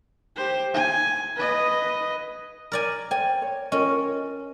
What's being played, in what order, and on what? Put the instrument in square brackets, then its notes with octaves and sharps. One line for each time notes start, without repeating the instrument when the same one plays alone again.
[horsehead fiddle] G4 C5
G#5
B4 D#5
[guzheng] A#4 D5 G#5
[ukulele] C5 D5 G5 [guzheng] G#5
[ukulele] C#5
[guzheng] C#4 [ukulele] F4 A#4 D#5
[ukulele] A#4